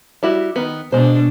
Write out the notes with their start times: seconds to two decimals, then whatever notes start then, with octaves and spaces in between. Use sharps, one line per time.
0.23 G3 E4 F#4
0.56 D#3 B3
0.92 B2 G#3 D4 C5